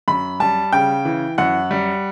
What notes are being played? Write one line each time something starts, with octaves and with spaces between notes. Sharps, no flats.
F#2 B5
G3 A5
C#3 G5
E3
F#2 F#5
G3